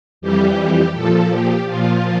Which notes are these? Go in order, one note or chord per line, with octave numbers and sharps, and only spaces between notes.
F2 E3 G3 G4
A#2 F3 A4
G4
A#2 F3 F4